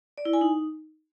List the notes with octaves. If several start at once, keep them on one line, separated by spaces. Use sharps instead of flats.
D5
E4
G#5
D#4